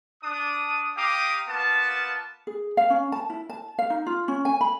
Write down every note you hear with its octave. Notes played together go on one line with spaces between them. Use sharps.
D4 D#6
G4 F5 G5 A#5 D6 D#6
A#3 B3 F4 B4 A5
G#4
F5
C#4
A5
E4
A5
F5
D#4
F4
C#4
G#5
B5